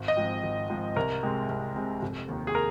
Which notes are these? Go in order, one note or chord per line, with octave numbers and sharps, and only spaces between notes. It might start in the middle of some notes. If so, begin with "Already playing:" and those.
Already playing: G#1
D#5
G#2 F3 C4
G#1
G#2 F3 C4
C2 A#4
C3 G#3 C4
C2
C3 G#3 C4
F1
D#2 D#3
G#4
A#4